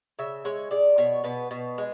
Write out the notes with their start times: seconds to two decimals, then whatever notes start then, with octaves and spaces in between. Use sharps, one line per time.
0.19 C#3 E5
0.45 G#3 C#5
0.71 G#3 D5
0.98 B2 C#5
1.24 B2 B4
1.51 B2
1.78 G#3